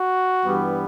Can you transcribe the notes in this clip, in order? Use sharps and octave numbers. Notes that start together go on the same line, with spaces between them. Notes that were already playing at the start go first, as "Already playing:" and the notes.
Already playing: F#4
G2 E3 G3 B3